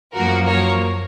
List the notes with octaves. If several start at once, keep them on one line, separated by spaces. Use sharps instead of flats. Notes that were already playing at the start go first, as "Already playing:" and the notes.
F#2 F3 A#3 F#4 A#4
A#4 C#5